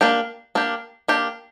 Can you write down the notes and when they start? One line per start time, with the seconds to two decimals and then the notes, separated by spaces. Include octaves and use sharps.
0.01 A#3 D4 G4
0.55 A#3 D4 G4
1.08 A#3 D4 G4